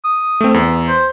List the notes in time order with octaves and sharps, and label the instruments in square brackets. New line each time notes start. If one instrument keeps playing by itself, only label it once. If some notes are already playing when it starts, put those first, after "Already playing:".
[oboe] D#6
[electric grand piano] A3 C4
E2
[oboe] C5